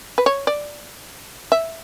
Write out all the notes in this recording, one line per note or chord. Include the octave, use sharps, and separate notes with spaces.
B4
C#5
D5
E5